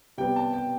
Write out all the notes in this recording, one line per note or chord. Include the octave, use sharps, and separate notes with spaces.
C3 G3 B3 G5
A5
G5